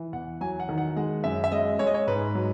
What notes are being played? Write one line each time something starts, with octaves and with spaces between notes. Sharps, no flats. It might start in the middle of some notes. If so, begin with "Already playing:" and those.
Already playing: E3
E2 F#5
F#3 G#5
F#5
D#3
F#5
G#3 F#5
F#2 E5
E5
G#3 D#5
G#3 C#5
D#5
C#5
G#2 B4
F#3